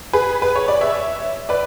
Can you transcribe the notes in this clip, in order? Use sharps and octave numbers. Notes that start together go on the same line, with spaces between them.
G#4 B4
B4
C#5
D5
C#5 E5
B4 D5